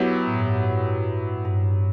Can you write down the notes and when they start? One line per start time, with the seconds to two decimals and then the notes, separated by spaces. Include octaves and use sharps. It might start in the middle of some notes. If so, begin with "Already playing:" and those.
Already playing: F#3 B3 E4 G4
0.27 A2
0.34 G2
1.45 G2